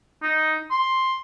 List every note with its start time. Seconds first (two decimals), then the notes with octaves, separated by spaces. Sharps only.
0.23 D#4
0.71 C6